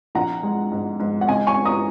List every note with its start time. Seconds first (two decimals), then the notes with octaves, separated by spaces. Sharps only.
0.15 A#1 F#5 A#5
0.43 G#3
0.72 G#2
1.00 G#2
1.21 F#5
1.28 C#3 D#5 G#5
1.47 G#5 C#6
1.56 C#4
1.65 A#5 D#6